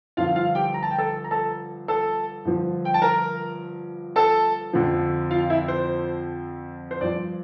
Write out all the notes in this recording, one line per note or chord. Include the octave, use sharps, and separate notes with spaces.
G2 D3 F3 F4 F5
F4 F5
G4 G5
A#5
A5
G5
A4 A5
A#5
A4 A5
A4 A5
G2 D3 F3
G5
A5
A#4 A#5
A4 A5
F2 D3 F3
F4 F5
E4 E5
C5
C5
G2 F3 D5